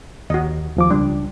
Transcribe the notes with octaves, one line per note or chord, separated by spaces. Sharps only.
D#2 F#4 D#5
D#2 F3 D6
C#2 G3 D4